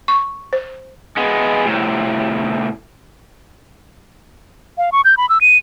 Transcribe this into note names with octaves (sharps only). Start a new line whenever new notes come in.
C#6
C5
G#3 B3
A2 C3
F5
C#6
G6
B5
E6
D#7